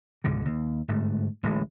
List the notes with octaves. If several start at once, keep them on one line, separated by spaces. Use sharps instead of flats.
C#2 G#2 B2 D3
D#2
G1 G#2 A3
D1 A1 A2 G#3